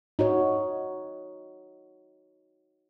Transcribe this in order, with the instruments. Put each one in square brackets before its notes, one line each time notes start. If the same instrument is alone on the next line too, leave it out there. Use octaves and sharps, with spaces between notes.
[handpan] D#4 F#4 C#5